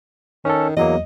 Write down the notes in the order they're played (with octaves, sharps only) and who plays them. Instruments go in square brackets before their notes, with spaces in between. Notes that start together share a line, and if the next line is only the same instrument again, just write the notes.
[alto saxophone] D#3 [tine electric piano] C#4 A4
[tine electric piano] E2 F#3 A#3 [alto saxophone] D#5